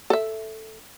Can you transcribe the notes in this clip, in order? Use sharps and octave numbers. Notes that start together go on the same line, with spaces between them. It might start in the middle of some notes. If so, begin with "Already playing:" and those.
A4 E5